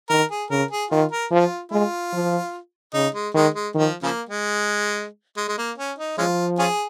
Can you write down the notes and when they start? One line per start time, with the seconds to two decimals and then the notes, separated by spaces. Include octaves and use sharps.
0.10 D#3 A#4
0.31 G#4
0.50 C#3 A#4
0.71 G#4
0.91 D#3 F4
1.11 A#4
1.32 F3 F4
1.72 G#3 F4
2.13 F3
2.93 C#3 D#4
3.15 G#3
3.34 D#3 G#3
3.54 G#3
3.75 D#3 F3
4.03 C#3 F3 A#3
4.29 G#3
5.37 G#3
5.48 G#3
5.58 A#3
5.78 C#4
5.99 D#4
6.18 F3 G#3 C#4 F4
6.59 C#4 F4 G#4